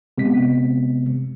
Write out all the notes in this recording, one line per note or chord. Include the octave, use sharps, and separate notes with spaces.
C3 G#3 B3 C4 B6